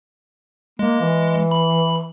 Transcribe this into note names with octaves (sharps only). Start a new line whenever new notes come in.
G#3 A#3
E3
B5